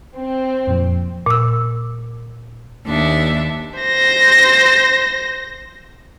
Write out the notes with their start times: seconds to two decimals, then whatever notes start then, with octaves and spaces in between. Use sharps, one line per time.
0.18 C4
0.67 F2 A#2 F3
1.26 A#2 E6
2.86 D#2 D4 E5
3.80 C5 A#6